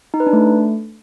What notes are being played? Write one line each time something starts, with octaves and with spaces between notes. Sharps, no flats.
D#4
B4
D4
A3